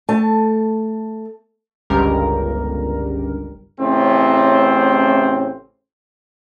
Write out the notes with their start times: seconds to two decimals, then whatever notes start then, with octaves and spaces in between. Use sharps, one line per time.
0.09 A3 A5
1.90 G1 C#2 G3 A#4
3.80 A1 A2 C#3 C4 C#4